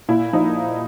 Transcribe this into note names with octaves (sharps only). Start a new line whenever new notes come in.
A#2 E4
F3 D#4